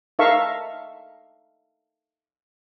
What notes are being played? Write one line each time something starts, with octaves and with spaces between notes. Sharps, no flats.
D#4 A4 A#4 E5 F5 C#6